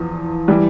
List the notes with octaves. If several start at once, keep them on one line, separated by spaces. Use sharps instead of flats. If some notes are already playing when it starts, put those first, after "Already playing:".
Already playing: E2 F3
E3 G3